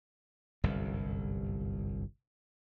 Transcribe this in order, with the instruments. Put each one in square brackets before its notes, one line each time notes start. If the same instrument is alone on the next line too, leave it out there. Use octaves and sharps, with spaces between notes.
[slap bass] G1 C2 F#2